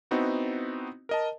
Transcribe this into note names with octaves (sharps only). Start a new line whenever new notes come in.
B3 C4 D#4 E4 F#4
A#4 D#5 A5